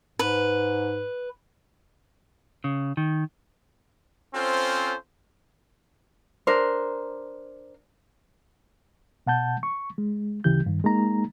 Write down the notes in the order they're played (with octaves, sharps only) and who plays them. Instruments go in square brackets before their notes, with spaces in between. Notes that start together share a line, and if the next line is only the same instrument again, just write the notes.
[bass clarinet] G#2 [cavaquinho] B4
[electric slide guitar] C#3
D#3
[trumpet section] C4 C#4 F4 A4 C5
[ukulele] D4 A#4 C5
[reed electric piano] B2 F#5 A5 G6
C#6
G#3
D2 C#3 E3 G4 G6
G2 D#3
G#3 A#3 D#4 A#5